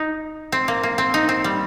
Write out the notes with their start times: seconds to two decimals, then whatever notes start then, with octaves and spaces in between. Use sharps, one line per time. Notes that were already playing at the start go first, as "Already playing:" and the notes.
Already playing: D#4
0.52 C4
0.68 A#3
0.83 A#3
0.98 C4
1.14 D#4
1.29 C4
1.44 G3